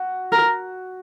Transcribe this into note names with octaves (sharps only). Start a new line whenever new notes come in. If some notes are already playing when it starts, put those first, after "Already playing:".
Already playing: F#4
A#4